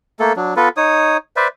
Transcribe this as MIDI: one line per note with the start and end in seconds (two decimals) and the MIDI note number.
0.20 0.33 57
0.20 0.33 58
0.20 0.33 69
0.36 0.54 54
0.36 0.54 62
0.56 0.69 59
0.56 0.69 65
0.56 0.69 69
0.56 0.69 71
0.77 1.17 63
0.77 1.17 73
0.77 1.17 87
1.36 1.48 71
1.36 1.48 72
1.36 1.48 74
1.36 1.48 76